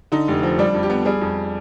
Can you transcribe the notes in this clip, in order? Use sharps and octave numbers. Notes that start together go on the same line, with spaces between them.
D3 D#4
F1
F3
G3 D4
F2
G4
B3
G3 G#4
F2